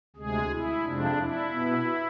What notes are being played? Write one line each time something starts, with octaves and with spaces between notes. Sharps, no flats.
D2 C3 G#3 G#4
E4
F2 C3 F3 G#3 C4 D4
E4
B2 B3